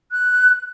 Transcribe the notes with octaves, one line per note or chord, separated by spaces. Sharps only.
F#6